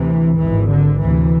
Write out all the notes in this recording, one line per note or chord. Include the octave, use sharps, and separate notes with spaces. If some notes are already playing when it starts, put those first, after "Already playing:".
Already playing: D2 C3 E3
G#1 G#2 E3
D3
D2 C3 E3